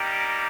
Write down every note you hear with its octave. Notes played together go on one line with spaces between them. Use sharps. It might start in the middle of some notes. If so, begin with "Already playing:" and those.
Already playing: G3 A#3 D#4 G4